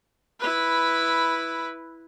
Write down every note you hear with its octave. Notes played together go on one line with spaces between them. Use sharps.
E4 B4